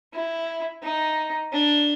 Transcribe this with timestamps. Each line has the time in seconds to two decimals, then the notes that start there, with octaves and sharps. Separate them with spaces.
0.13 E4
0.83 D#4
1.53 D4